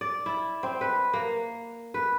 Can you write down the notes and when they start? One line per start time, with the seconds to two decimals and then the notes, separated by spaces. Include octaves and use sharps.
0.01 D5
0.26 E4
0.63 C4
0.81 B4
1.14 A#3
1.94 B4